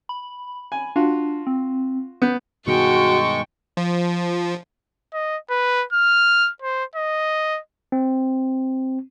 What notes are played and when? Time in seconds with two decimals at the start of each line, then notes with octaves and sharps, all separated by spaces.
0.09 B5
0.72 G#5
0.96 D4 F4 F#4
1.47 C4
2.22 B3 G6
2.67 G2 B2 D#3 G#3 F#4 G5 A5 C#6
3.77 F3
5.13 D#5
5.50 B4
5.93 F6
6.62 C5
6.96 D#5
7.92 C4